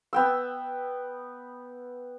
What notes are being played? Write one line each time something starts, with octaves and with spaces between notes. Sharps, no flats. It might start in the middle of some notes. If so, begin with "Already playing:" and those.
B3 G5 E6